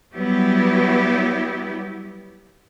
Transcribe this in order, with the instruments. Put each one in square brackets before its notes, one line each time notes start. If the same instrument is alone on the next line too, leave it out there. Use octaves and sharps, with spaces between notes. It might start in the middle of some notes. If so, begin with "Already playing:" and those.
[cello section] F#3 G3 B3 E4 G4